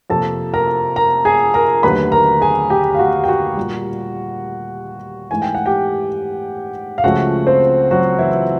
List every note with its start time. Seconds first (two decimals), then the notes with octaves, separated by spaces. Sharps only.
0.10 F2 C3 F3 A#3 A4 A5
0.54 A#4 A#5
0.96 A#4 A#5
1.25 G#4 G#5
1.54 A#4 A#5
1.83 D#2 D3 F#3 A3 B4 B5
2.12 A#4 A#5
2.41 G#4 G#5
2.70 G4 G5
2.94 F5
2.99 F#4 F#5
3.24 G5
3.28 F#4 F#5
3.57 A#2 G3 A#3
5.31 G#2 E3 A3 G#5
5.42 G5
5.55 F#5
5.66 G4 G5
6.98 F5
7.04 C#2 C#3 F3 A3 F#4 F#5
7.47 C4 C5
7.91 F#3 F#4
8.19 E3 E4